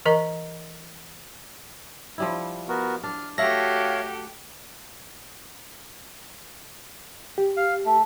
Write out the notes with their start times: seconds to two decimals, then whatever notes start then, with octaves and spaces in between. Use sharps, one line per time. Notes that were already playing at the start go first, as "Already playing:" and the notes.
0.05 E3 A#4 D#5 A#5
2.18 F3 G3 E4
2.69 B3 F#4 A#4
3.04 D4 F6
3.38 A3 F#4 G4 A4 C#5 E5 F5 A#6
7.38 G4
7.57 F5
7.85 A3